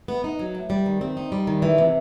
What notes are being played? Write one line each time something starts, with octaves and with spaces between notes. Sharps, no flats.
B3
D#4
F#3
A2
G3
D#3
C4
D#4
G3
D#3
E3
C3